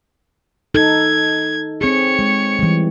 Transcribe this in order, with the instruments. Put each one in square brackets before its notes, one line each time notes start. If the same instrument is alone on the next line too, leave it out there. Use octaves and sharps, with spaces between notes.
[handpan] D#4 A4 [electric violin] G#6
[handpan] C4 G#4 [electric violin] C#5 C#7
[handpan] G#3
E3 G3